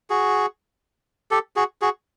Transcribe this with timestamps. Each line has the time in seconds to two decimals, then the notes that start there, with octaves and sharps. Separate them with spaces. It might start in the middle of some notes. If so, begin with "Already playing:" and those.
0.10 F#4 G#4
1.31 G4 A4
1.56 F#4 G#4
1.82 F#4 G#4